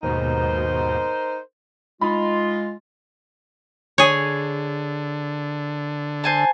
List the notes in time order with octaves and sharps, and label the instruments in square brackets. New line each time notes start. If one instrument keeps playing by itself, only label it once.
[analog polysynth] D#2 G#2 B2 [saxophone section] D#4 A#4 C5
[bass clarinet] G#3 [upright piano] D#4 B5 [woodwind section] F4
[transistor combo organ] D3 [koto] G#4 C#5
[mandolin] C5 G#5 A5